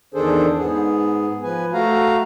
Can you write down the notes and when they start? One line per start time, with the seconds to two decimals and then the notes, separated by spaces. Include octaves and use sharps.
0.14 E2 D#3 D4 G#4 A4 C5
0.58 G#2 B3 G#4
1.43 F3 B4 G#5
1.73 A3 F#4 F5 A#5